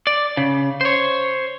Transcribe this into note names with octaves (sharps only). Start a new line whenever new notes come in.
D5
C#3
C5 C#5